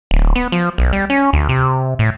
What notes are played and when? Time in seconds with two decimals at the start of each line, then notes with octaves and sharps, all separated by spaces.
0.11 D1
0.35 B3
0.52 F3
0.78 B1
0.93 G3
1.10 C#4
1.33 D2
1.49 C3
1.99 A2